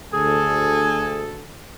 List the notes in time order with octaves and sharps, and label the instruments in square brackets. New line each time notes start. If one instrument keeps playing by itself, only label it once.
[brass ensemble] D2 A4 [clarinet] G#4 [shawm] G#5